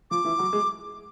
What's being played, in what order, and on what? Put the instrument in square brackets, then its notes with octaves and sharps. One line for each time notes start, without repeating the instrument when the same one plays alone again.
[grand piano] F3 F4 [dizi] D6
[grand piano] E3 E4
F#3 F#4
G#3 G#4